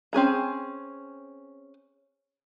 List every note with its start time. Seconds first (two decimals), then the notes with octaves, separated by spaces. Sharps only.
0.13 C4 C#4 G#4 A#5